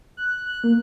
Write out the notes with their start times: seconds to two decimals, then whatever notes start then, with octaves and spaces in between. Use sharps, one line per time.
0.17 F#6
0.46 F#6
0.64 A#3